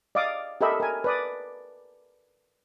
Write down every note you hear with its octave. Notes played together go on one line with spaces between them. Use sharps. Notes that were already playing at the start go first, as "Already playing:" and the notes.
D5 D#5 F5 D6 D#6
G4 A4 A#4 D#5 E5 B5
A#4 G#5
B4 D5 D#6